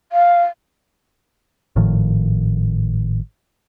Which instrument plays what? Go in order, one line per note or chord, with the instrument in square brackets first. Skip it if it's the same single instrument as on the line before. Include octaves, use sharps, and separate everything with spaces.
[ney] F5
[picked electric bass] G#1 A2 D#3 F3